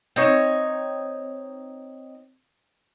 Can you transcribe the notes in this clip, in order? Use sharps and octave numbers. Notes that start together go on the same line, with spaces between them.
C4 D#4 C#5